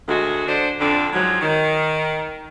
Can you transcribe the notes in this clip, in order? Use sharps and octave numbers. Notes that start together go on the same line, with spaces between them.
D2 G#3 F#4
D3 D4 C5
F2 D3 C4 D4
G#2 F3 F#3
D#3